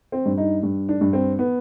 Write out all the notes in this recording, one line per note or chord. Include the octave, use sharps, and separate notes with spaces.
C4
G2
D#4
G2
D4
G2
C4
B3